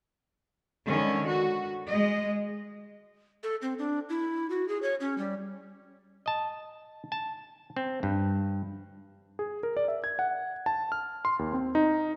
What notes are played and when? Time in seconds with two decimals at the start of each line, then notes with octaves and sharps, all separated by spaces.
0.86 D3 D#3 G#3 C#4
1.26 F#4
1.87 G#3 D#5
3.43 A4
3.62 C4
3.79 D4
4.09 E4
4.50 F#4
4.68 G#4
4.82 C#5
5.00 C#4
5.18 G3
6.26 D#5 A5
7.12 A5
7.76 C4
8.03 G2
9.39 G#4
9.63 A#4
9.77 D5
9.88 E5
10.04 G#6
10.19 F#5
10.66 A5
10.92 F6
11.25 C6
11.39 D#2
11.53 C4
11.75 D#4